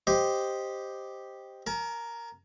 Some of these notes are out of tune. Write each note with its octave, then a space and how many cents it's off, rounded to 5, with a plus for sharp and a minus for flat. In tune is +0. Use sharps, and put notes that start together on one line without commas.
G4 +0 C5 +0 D#5 +0
A#4 +0 G#5 +45